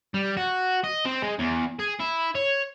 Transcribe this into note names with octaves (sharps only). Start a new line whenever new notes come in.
G3
F#4
D#5
C4
G#3
E2
G#4
E4
C#5